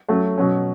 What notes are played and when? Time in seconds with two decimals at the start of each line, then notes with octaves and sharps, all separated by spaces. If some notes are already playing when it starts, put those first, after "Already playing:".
0.08 F#3 A3 C#4
0.38 B2 F#3 C#4